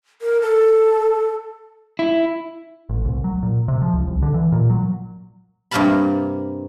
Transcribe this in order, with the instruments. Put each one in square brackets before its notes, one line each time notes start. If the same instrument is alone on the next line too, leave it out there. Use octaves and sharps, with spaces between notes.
[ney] A#4
A4
[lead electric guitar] E4
[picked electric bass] A1
C2
F#3
A#2
C3
F3
C#2
C2
D3
E3
A#2
F#3
[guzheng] G2 C3 A#3 A#4 A5 B5